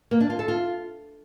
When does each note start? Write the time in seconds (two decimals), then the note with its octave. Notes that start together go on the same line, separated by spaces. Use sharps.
0.11 A#3
0.20 D4
0.30 F4
0.39 A4
0.48 F4